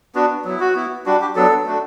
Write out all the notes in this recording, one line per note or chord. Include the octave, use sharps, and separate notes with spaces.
B3 D4 F#4
F#3 B3 E4
F#4
B3 E4
G3 D4 F#4
G4
F#3 B3 D4 A4
A3 D4 F#4